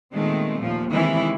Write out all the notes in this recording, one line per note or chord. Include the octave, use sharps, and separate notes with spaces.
A#2 D#3 G#3 A3 B3 C4
D#2 A#2 F3
C3 D#3 E3 G#3 E4